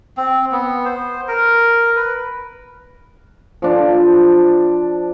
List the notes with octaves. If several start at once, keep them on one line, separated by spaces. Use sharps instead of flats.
C4
B3
C5
A#4
B4
F3 D4